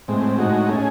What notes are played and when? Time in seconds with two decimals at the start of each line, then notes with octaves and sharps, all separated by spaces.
0.08 A2 G#3 C4
0.39 A2 G#3 D#4 F#4
0.69 A3 C#4 G#4